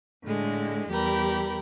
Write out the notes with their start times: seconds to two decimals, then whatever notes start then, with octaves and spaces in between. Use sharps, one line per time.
0.24 A2 D3 G#3
0.90 E2 G3 G4 A#4 B5